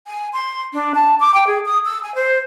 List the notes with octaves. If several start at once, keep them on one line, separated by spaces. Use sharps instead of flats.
G#5
C6
D4
A5
D6
G5
G#4
D#6
E6
G#5
C5